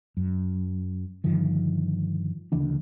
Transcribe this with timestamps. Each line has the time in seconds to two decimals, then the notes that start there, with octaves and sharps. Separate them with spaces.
0.17 F#2
1.24 G2 D3 D#3 F3
2.52 D2 C#3 E3 D4